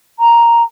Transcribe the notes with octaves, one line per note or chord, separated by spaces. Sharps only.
A#5